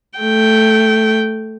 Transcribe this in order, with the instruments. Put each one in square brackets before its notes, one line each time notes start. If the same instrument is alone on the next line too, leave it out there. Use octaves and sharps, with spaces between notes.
[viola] A3 G5